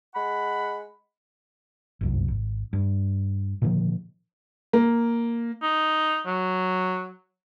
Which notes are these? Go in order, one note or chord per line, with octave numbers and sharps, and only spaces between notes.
G#3 F#5 B5
G1 C2 F#2
G#1
G2
A#2 D3 D#3 F3
A#3
D#4
F#3